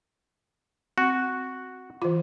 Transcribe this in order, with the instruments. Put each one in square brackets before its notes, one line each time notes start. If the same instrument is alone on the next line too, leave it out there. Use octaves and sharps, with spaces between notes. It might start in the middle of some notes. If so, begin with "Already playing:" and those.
[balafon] C4 [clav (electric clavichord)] F#4
[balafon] E3 F4